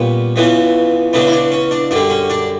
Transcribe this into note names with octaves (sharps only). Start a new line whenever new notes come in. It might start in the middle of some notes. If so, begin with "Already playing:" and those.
Already playing: A#2 G3 B3 C#4
C#2 C#3 E3 B3
C#2 C#3 E3 B3 D4
E4
D4
C#4
D4
F#2 D3 G3 D4
C#4
D4